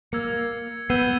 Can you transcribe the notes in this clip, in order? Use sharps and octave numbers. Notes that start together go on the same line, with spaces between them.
A#3 E6 G#6 C#7
B3 E6 G6 C7 D#7 G7